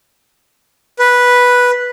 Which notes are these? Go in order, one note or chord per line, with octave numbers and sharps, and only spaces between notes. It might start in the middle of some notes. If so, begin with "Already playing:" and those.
B4